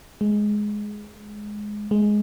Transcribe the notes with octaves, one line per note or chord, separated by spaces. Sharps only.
G#3
G#3